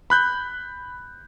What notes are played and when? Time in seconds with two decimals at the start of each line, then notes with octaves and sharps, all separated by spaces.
0.10 B5 F#6 G6